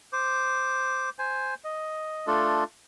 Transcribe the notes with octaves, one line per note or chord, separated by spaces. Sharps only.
C5 D6
C5 G#5
D#5
A3 D4 F4 A4